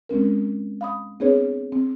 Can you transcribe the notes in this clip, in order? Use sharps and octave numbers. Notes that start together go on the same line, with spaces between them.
G#3 C4 C#4 A#4
F5 B5 D#6
B3 C4 D4 G#4 B4 C#5
C4